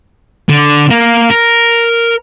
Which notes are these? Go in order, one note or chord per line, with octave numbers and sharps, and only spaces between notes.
D3
A#3
A#4